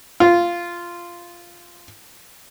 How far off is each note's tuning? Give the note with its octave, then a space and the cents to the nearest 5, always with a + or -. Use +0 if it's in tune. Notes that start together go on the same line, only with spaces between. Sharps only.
F4 -10